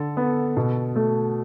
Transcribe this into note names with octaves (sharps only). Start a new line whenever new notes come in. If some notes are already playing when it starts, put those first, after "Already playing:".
Already playing: D3 A4
B3
B2
A3